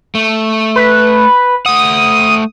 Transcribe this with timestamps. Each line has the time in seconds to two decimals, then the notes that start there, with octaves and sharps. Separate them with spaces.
0.15 A3
0.76 B4
1.66 A3 F#5 D#6